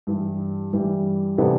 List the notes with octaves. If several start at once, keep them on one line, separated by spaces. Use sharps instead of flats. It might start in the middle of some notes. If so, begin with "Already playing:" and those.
G2 E3 G3
G2 E3 G3
C3 E3 B3 D4 A4